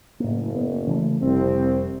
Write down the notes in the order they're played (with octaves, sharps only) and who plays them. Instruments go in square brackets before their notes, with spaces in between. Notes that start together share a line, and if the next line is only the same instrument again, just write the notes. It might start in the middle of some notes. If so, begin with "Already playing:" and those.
[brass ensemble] F#1 [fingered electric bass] A2 A#3
[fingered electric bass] B3
C#3 E3 A3
[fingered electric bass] F1 [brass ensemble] C2 C4